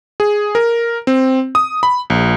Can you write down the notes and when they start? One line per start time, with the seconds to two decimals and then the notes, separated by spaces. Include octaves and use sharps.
0.20 G#4
0.55 A#4
1.07 C4
1.55 D#6
1.83 B5
2.10 A#1